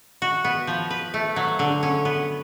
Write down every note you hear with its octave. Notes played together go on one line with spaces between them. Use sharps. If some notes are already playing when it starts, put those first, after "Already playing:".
F#4
B3
F3
B4
A3
F#3
D3
C#4
B3